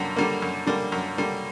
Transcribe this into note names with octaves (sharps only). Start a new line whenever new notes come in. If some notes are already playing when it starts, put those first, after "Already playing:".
Already playing: F#2 D3 G3 A#3
D3 G3 A#3
F#2
D3 G3 A#3
F#2
D3 G3 A#3